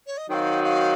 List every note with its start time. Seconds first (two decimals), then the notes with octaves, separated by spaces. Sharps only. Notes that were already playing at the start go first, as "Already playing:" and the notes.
0.06 C#5
0.17 D#5
0.30 D#3 F#3 C4 D#4 F#4 F5 G5
0.64 F5